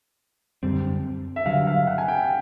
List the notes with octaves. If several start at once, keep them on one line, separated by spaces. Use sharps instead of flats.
F#2 D3 G3 C4
E5
G2 D3 F#3 F5
F5
F#5
G#5
G5